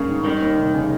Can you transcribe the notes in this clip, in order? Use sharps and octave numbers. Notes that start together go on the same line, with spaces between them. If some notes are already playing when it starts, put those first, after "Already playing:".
Already playing: G#1 G2 C#3 A#3
D#3
D#3 G3
D#2
F1
C#3